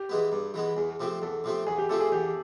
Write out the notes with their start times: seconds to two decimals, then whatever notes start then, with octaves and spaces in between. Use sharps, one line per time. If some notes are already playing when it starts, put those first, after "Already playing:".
Already playing: G4
0.09 E3 G#3 B3
0.32 G2
0.54 E3 G#3 B3
0.76 E2 G#4
1.00 C3 F3 A3 C4
1.22 E2 A4
1.44 C3 F3 A3 C4
1.67 E2 G#4
1.78 G4
1.89 C3 F3 A3 C4 A4
2.00 G#4
2.12 E2 G4